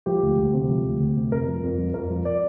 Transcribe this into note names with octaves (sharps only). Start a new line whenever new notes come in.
F3 G4
D2
D2
C3
F3
D2
D2
C3
F2 A#4
F3
F2
F3
F2 A#4
F3
D5